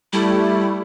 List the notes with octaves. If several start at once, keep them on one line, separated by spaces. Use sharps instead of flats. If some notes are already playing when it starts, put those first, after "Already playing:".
G3 A3 E4